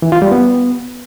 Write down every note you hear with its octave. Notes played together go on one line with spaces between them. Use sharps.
E3
F4
G3
B3